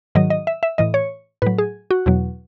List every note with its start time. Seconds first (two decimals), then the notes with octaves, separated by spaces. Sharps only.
0.15 G#2 D#3 F#3 D#5
0.30 D#5
0.47 E5
0.63 E5
0.78 A2 E3 D#5
0.94 C#5
1.42 A2 F#3 B4
1.58 G#4
1.91 F#4
2.06 E2 B2 F#3